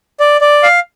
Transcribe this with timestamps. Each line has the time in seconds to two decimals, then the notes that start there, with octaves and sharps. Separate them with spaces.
0.20 D5
0.41 D5
0.63 F5